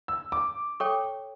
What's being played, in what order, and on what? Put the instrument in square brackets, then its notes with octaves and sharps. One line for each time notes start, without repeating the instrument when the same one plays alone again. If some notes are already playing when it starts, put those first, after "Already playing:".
[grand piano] E6
D6
[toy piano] A4 C#5 G5 C#6